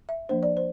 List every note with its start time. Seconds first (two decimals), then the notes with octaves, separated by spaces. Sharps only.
0.09 E5
0.29 F3 A#3 D4 C5
0.43 D5
0.57 C5